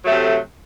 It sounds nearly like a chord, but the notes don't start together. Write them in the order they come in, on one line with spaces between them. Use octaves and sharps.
F#3 A3 C3